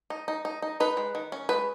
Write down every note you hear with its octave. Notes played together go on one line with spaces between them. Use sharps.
D#4
D#4
D#4
D#4
D#4 B4
G#3
D#3
C#4
G#3 B4